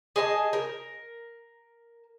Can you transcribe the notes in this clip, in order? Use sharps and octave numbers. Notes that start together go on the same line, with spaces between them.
G#4 D#5 A5
A#4